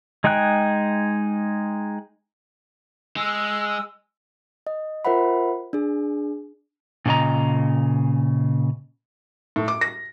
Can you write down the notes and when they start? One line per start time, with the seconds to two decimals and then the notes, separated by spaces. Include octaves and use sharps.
0.24 G#3 D#4 G#4 G5 F#6
3.17 G#3 E6
4.67 D#5
5.05 F4 A#4 C5 E5 F#5 B5
5.73 D4 G#4
7.06 A#2 C#3 A4 D#5 A#5
9.56 A2
9.68 D6
9.81 A#6